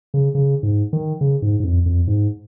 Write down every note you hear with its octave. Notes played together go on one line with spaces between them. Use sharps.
C#3
C#3
G#2
D#3
C#3
G#2
G#2
F2
F2
G#2